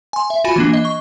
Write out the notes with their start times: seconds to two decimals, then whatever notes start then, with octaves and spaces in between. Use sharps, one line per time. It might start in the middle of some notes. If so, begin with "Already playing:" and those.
0.13 G#5 C6
0.30 E5
0.44 F4 F#4 G#5 B5
0.56 E3 A#3 D4
0.73 D#5
0.85 C#6